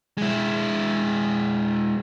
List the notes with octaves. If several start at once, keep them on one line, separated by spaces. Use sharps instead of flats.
G#3 E4